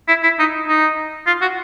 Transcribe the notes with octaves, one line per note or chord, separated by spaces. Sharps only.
E4
E4
D#4
D#4
F4
F#4